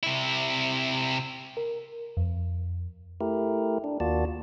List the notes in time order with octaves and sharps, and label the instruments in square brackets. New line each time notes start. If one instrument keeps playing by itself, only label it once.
[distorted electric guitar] C3 E4
[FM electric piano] A#4
F2
[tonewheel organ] A3 E4 G4 A#4
D4
D#2 A#3 F4 F#4 D5 A5